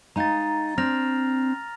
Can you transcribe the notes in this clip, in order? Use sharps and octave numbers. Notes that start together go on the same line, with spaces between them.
G#3 D#4 F5 A#5 A6
C4 D4 F6 A#6 F7